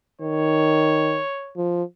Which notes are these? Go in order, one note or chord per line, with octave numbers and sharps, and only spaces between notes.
D#3 C#5
F3